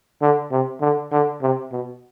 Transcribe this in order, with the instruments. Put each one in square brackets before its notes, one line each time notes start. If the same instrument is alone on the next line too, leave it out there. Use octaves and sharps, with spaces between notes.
[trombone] D3
C3
D3
D3
C3
B2